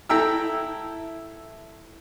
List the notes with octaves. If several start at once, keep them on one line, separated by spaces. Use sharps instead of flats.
E4 A4 E5 G5 A#5 E6